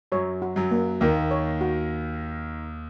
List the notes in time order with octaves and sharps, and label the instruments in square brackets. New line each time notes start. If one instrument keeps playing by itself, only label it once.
[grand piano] F#2 F#3 [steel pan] C#5
[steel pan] F#4
[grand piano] F#2 F#3
[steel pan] A#3
[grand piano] D#2 D#3 [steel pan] A#3
[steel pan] C#5
F#4